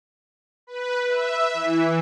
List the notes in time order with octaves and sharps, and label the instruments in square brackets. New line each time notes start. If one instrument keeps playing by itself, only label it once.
[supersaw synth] B4
E5
E3